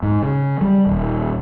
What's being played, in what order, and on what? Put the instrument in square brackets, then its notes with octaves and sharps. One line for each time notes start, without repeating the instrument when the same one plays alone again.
[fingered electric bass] G#2
C#3
G3
D#1